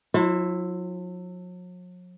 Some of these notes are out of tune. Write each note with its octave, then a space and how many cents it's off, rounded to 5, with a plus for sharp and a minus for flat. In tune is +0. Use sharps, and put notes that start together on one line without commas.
F#3 -45 E4 +0 C5 +0